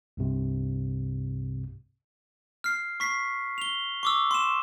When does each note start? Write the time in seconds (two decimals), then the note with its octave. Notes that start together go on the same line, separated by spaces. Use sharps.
0.17 C2 G2 C3
2.64 F6 C7
3.00 C#6 B6 C7
3.58 F7 G7
4.03 C#6 D6 E6
4.31 C6 E7